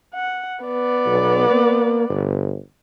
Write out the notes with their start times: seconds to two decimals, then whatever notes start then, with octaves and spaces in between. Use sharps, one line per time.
0.14 F#5
0.64 B3 D5
1.06 B1
1.50 A#3
2.10 G1